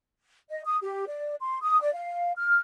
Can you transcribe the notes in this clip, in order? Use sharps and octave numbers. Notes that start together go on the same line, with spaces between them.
D#5
D#6
G4
D5
C6
D#6
D5
F5
F6